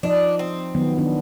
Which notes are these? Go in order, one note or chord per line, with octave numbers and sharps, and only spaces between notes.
F3 D4 D#4 D#5
C4
D#3 F#3 B3
D#3 B3 D4